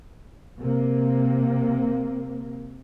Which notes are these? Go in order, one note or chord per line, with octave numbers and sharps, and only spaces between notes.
C3 A#3